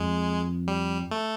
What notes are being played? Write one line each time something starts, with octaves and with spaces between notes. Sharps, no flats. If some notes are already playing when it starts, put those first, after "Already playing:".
Already playing: F2 G#3
G3
A3